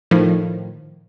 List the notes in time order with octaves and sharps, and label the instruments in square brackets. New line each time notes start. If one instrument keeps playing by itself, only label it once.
[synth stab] A2 D#3 F3